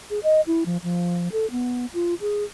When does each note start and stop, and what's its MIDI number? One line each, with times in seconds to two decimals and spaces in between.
0.10 0.19 68
0.23 0.41 75
0.47 0.64 64
0.66 0.77 53
0.83 1.29 53
1.32 1.49 69
1.51 1.86 59
1.94 2.14 65
2.21 2.44 68